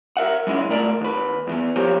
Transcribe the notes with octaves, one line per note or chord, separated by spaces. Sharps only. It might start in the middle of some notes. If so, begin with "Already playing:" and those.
A#4 E5 F#5
F#3 G#3 C#4 E4
C2 G#2 A3 A#4 D5
D#2 B4
E2 E3 B3
F3 A#3 G4 A#4 C5 C#5